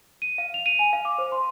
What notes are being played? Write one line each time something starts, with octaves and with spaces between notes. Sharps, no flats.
D#7
F5
F7
D#7
G#5
F5
D6
C5
C6